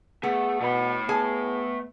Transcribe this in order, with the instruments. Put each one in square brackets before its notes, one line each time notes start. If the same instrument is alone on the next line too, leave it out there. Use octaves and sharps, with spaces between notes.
[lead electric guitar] A3 [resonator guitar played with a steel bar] B3 [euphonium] G#4
[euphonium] B2 [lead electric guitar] A3 B5
[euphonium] B3 [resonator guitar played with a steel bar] G#4 G#5 A5